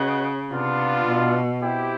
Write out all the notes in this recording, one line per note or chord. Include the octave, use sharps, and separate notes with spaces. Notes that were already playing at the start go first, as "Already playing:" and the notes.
Already playing: C#3 F#4 B4 D#5 F#5
C3 B3 D4 F4
B2
C4 E4 G4